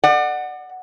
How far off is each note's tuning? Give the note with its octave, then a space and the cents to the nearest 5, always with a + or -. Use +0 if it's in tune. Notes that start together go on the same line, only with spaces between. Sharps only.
D5 +35 F#5 +0